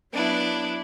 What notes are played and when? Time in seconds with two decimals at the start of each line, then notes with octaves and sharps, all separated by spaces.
0.13 F#3 B3 D4 E4